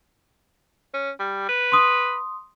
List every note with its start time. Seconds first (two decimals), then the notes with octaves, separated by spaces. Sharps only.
0.94 C#4
1.19 G3
1.49 B4
1.72 C6 D#6